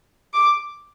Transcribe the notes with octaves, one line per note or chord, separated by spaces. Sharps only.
D6